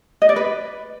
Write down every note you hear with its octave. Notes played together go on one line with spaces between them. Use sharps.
D#5
D5
B4